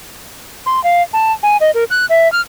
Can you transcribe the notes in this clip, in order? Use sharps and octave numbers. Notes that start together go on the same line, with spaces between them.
C6
F5
A5
G#5
D#5
A#4
F#6
E5
F6